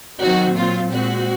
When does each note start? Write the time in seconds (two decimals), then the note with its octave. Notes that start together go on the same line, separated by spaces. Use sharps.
0.20 D#3 F#3 C4 F#4
0.56 A#2 F#3 C4 F4
0.91 A#2 G#3 C4 F#4